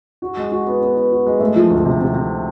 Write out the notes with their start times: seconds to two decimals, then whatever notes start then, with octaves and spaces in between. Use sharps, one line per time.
0.22 F#4
0.37 G#3
0.52 F#4
0.67 B3
0.81 B3
0.97 B3
1.12 F#4
1.26 G#3
1.40 A3
1.56 F3
1.71 D2
1.85 C3
2.00 C3
2.14 C3